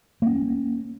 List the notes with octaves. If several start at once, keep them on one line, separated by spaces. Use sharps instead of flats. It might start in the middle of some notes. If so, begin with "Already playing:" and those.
A#3 C#4